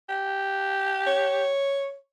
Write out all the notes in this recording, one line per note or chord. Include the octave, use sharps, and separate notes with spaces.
G4
C#5